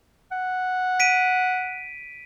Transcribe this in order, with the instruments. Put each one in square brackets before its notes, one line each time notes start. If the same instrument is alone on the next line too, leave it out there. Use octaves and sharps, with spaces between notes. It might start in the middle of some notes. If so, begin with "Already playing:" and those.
[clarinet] F#5
[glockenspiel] B6 D7 D#7